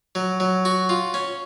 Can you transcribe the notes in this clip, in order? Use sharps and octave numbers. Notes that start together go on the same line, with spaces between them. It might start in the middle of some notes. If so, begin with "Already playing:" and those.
F#3
F#3
F#4
F4
C#4